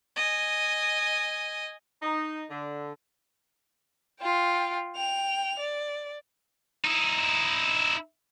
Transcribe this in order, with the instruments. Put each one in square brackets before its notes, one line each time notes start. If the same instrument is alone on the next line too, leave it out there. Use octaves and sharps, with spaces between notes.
[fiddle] D#5 G#5
[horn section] D#4
D3
[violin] F4 G5
G5 F7
D5
[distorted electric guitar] D#4 E4